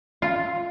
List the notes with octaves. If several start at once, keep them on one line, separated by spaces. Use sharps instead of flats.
F4